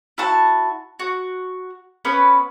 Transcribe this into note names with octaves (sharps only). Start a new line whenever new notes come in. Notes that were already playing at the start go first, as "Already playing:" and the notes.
E4 F#4 A5
F#4
B3 C#4 B4 B5